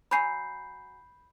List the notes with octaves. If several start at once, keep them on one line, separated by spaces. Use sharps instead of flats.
F#3 G#5 A#5 B5 G6 C7